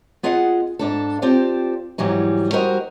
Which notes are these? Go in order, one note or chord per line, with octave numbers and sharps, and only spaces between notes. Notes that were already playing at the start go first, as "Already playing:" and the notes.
B3 F4 G#4 D#5 F#5
G#2 D4 A4
C4 F4 G4 A4 C5 D5
G#2 E3 F#3 G3 D#4
G3 D#4 F#4 A#4 C5 D#5